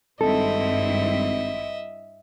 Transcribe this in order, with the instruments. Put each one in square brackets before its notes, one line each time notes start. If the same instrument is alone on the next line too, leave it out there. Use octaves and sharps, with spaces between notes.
[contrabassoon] G#1 [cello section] G2 C4 E4 [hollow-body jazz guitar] A4 [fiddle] D#5 E5